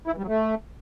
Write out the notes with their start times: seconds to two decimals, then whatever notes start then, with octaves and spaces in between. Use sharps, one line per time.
0.08 E4
0.13 E3
0.18 G3
0.23 F#3
0.28 A3